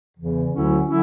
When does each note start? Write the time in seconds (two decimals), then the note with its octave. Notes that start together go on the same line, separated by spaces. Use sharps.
0.17 E2 C#3 E3
0.51 D2 D3 F#3 C#4 E4
0.87 D3 F#3 C#4 E4